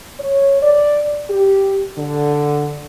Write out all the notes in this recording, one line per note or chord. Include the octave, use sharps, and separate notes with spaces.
C#5
D5
G4
D3